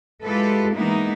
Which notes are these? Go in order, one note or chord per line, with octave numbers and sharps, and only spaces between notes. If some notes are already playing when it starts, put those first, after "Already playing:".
G#3 E4 F4 G4 A4 B4
E3 G#3 A#3 B3 D#4 E4